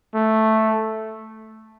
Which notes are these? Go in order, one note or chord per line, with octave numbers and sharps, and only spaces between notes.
A3